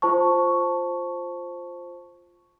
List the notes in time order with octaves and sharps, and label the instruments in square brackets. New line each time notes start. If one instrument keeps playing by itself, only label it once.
[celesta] F4 C5 A5 C#6